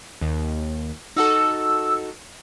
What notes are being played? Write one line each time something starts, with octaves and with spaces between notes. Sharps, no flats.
D#2
D#4 F#4 A4 E6